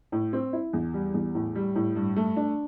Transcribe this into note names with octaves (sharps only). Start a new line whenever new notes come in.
A2
C4
E4
E2
G3
E2
A2
G3
A2
G2
A3
D4